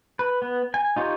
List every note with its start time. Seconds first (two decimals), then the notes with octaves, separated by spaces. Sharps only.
0.19 B4
0.42 B3
0.74 G#5
0.96 D#4 F4 G4 C#5